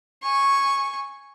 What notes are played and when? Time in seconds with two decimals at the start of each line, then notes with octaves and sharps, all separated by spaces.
0.23 G#5 C#6